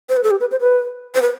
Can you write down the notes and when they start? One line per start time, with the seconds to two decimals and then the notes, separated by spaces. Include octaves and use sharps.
0.09 C5
0.17 B4
0.24 A4
0.31 G4
0.40 B4
0.51 C5
0.61 B4
1.15 C5
1.22 B4